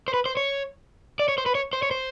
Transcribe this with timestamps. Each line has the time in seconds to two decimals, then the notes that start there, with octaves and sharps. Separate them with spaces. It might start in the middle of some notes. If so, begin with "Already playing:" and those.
0.08 C5
0.14 B4
0.26 C5
0.37 C#5
1.19 D5
1.28 C#5
1.38 C5
1.46 B4
1.55 C#5
1.73 C5
1.83 C#5
1.91 C5